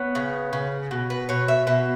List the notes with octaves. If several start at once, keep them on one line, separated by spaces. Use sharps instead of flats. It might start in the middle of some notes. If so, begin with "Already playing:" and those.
Already playing: B3 C#5
C#3
C#3
B2
B4
B2 C#5
E5
B2 E5